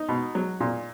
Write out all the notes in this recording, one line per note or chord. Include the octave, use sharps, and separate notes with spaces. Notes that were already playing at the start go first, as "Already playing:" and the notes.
Already playing: D#4
B2
F#3
A#2